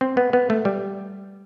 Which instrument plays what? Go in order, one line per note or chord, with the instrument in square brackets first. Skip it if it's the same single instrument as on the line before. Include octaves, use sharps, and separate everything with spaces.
[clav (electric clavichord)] C4
B3
B3
A3
G3